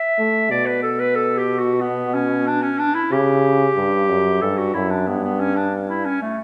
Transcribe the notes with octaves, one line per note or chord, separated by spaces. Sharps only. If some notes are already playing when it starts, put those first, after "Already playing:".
Already playing: E5
A3
B2 D5
B4
A4
B4
A4
G4
F#4
B3
C#4
D4
C#4
D4
E4
C#3 G4
G2
F#2
G2 A4
F#4
F#2 E4
D4
G2 B3
B3
C#4
D4
E4
C#4
A3